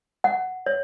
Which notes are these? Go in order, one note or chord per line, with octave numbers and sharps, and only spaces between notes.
F#5
C#5